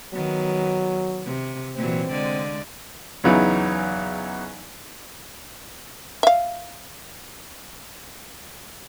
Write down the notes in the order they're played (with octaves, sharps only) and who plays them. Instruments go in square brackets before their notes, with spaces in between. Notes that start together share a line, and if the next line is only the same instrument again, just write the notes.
[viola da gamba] D#3 B3 [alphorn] F#3
[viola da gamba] C3
[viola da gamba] A#2 E3 F#3 [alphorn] C4
[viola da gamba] D3 G#3 D5
[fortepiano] E2 C#3 F#3 B3 D#4 E4
[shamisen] E5 F5